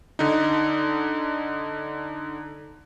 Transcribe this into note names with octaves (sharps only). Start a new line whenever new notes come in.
D3 D#4